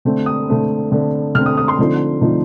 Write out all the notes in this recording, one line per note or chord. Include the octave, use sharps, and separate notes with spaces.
D3 A3 C4
D#6
D3 A3 C4
D3 A3 C4
D3 A3 C4 F6
D#6
D#6
C6
D3 F3 A3 C4 D#4
D3 F3 A3 C4 D#4